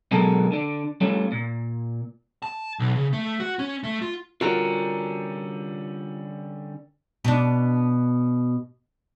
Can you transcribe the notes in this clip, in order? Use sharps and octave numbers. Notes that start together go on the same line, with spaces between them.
B2 D3 F#3 G#3 A4 A#4
D3 D4
G3 A3 C#4 F4
A#2
A5
B1
C#3
A3
F#4
C#4
A3
F4
D3 G3 C#4 F4 F#4 A4 A#4
B2 D4